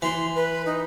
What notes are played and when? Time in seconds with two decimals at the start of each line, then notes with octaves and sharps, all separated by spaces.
0.02 E3 C6
0.35 B4
0.66 D#4